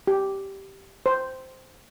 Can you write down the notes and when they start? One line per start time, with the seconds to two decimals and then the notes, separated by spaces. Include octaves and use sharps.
0.07 G4
1.06 C5